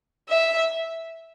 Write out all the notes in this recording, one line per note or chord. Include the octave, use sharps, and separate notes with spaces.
E5